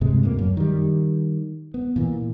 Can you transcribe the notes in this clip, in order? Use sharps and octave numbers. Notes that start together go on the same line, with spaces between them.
G2 C3 G#3
D2 G2 A#3
F#2
D#3 G3
B3
A#2 E3